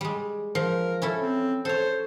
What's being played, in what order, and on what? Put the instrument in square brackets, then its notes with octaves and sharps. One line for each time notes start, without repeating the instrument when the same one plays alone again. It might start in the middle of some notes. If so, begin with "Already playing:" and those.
[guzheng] G3 G#3
[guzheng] F3 [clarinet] A#4
[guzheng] C#4 E4 A4
[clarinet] C4
[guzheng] A4 C#5 [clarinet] C5